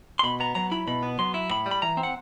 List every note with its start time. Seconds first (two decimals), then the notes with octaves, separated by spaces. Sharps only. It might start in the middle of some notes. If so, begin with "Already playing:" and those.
0.19 C6
0.23 B2 B5
0.40 B3 A#5
0.55 F#3 A#5
0.71 E4 B5
0.88 B2 B5
1.03 B3
1.19 F#3 C6
1.34 E4
1.50 A2 B5
1.66 G3
1.71 B5
1.82 E3 A#5
1.97 C4
2.03 F#5